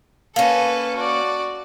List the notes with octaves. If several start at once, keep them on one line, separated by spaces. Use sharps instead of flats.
A#3 C#4 A4 B4
F#4 D5